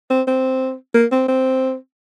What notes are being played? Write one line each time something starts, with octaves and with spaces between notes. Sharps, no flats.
C4
C4
A#3
C4
C4